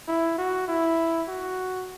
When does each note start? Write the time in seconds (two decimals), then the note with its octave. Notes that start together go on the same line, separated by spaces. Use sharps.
0.08 E4
0.38 F#4
0.68 E4
1.28 F#4